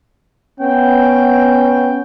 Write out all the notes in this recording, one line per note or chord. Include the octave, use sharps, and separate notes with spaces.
B3 C#4 G5